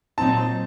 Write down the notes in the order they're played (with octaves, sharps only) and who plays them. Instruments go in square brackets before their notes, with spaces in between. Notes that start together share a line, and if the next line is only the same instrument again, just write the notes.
[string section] A#2 F#3 C4 D#4 [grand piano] A5